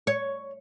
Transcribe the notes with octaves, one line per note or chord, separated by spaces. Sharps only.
C#5